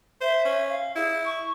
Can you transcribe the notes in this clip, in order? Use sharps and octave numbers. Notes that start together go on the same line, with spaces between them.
C5 E5
C#4
F5
E4 G#4
C#6